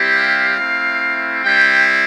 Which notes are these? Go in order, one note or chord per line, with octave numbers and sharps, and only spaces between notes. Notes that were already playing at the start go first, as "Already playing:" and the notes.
Already playing: G3 C4 E4 G4
F5
A3 C4 E4
G3 C4 E4 G5